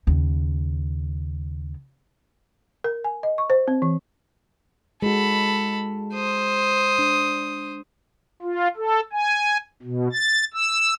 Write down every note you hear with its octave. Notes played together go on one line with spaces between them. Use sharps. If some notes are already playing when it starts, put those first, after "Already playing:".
D#2 C#3
A#4
G#5
D#5
C#6
C5
C4
E3
G#3 F#4 A4 B5
C5 D#6
D4
F4
A4
G#5
B2
A6
E6